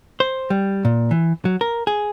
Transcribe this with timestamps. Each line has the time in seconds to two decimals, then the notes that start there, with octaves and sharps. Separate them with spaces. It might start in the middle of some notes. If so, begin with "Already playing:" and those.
0.20 C5
0.50 G3
0.85 A#2
1.11 E3
1.45 F#3
1.61 A#4
1.87 G#4